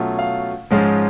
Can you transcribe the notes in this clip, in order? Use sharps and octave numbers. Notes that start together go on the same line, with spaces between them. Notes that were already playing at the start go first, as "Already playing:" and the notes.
Already playing: B2 F#3 A3 C#4 F4
F5
G#2 F3 G#3 C#4 F4